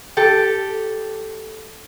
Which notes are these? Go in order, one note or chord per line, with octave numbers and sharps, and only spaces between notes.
G4 A4